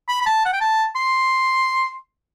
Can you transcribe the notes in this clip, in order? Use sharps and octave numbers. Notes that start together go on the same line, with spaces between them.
B5
B5
A5
F#5
G5
A5
C6